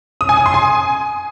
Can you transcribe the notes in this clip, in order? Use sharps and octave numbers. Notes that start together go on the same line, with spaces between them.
D#6
G#5
D#6
C6
G#5